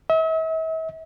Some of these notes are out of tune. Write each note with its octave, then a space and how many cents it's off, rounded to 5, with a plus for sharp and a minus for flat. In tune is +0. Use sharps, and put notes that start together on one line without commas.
E5 -40